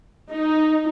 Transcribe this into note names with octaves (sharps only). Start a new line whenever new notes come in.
D#4